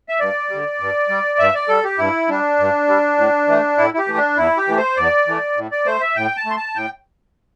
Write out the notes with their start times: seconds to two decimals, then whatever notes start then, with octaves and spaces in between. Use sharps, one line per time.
0.09 E5
0.19 G2 D5
0.49 D3 G3
0.80 G2
1.09 G3
1.39 G2 E5
1.55 D5
1.68 G3 A4
1.84 G4
1.98 G2 E4
2.29 G3 D4
2.59 G2
2.88 G3
3.18 A2
3.48 E3 A3
3.77 A2 E4
3.94 E4
3.98 G4
4.08 E3 A3
4.17 D4
4.37 E2 E4
4.57 G4
4.67 E3 A3
4.77 C5
4.97 E2 D5
5.27 E3 A3
5.57 A2
5.71 D5
5.86 A3 C5
6.01 E5
6.16 A2 G5
6.37 A5
6.46 A3 C6
6.56 A5
6.76 A2 G5